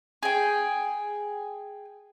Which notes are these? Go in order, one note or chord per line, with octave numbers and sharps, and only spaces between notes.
G#4 G5